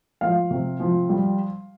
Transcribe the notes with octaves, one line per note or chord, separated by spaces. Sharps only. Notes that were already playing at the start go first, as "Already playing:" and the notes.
F3 F5
C3
F3
G3